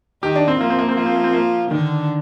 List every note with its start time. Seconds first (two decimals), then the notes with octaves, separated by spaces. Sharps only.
0.23 D#3 D#4 G4
0.36 D4
0.48 C4
0.60 F3 A#3 F4
0.70 C4
0.79 A#3
0.88 C4
0.97 F3 A#3 F4
1.06 C4
1.15 A#3
1.24 C4
1.33 A#3
1.71 D3 D#3 D4